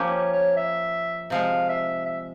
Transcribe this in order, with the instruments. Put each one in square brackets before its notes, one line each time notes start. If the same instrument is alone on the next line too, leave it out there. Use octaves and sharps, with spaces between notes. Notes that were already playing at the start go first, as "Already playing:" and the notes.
Already playing: [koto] F3 A#3 C#4 G4
[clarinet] C#5
C#5
E5
[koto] C3 F3 G#3 [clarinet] F5
[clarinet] E5
E5